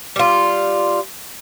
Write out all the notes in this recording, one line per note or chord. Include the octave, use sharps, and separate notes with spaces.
G3 F4